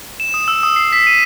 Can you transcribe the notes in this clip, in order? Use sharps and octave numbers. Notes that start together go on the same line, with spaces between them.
E7
D#6
E6
D#6
C7
B6
D#7